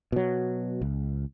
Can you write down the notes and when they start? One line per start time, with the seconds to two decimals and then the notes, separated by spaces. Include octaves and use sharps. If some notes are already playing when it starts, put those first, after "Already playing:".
0.12 B2 F#3
0.81 C#2